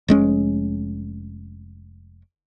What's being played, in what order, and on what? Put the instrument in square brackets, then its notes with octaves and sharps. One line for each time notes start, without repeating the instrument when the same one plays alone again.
[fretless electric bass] F1 G#3 C#4